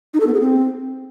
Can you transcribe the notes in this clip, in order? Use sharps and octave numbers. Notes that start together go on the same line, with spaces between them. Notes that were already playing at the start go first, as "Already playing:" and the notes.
D#4
A4
B3
G#4
C4